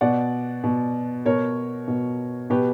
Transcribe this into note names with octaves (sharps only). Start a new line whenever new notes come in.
B2 D5 F#5
B2
B2 A#4 C#5
B2
B2 G4 B4